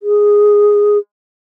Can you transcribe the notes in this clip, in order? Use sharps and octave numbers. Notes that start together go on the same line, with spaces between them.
G#4